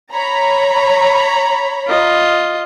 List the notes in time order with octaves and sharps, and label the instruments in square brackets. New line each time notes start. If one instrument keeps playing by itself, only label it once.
[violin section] C#5 A#5 B5
[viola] F4 D#5